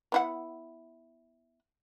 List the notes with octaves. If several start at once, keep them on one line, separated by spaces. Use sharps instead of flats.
B3 E4 F#5